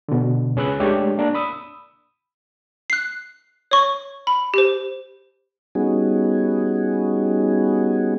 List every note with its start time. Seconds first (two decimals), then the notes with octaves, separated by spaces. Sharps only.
0.08 B2 D3
0.56 C#2 C#4 G#4 B4 E6 F#6
0.80 G#3 A3 D4 G4 C#5
1.18 A#3 D4 A#4 D5
1.34 B5 D#6 E6
2.90 F#6 C7
3.71 C#5 C#6
4.27 B5
4.54 G4 C5
5.75 G3 B3 C#4 D#4 F#4 G#4